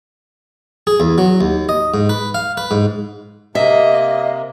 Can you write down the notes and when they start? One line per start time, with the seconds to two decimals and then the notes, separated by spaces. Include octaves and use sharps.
0.87 G#4
1.00 E2
1.18 F#3
1.41 D#2
1.69 D#5
1.94 G#2
2.09 B4
2.35 F5
2.57 B4
2.71 G#2
3.55 C3 A#3 D#5 E5